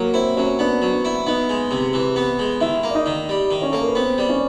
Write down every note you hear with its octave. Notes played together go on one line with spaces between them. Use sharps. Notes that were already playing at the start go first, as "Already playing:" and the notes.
Already playing: F#3 A#3 A#4
C4 E4 C5
F#3 C#4 C#5
B3 D4 D5
F#3
D4 D5
E4
B3 D#4 D#5
G#3
C3
E3
B3
G#3
D#3 E4 E5
A#3
D5
D#4 D#5
D#3
G3
D#3
C#4 C#5
A#3 A4
A#4
B4
B3 C4 C5
G3
C#4 C#5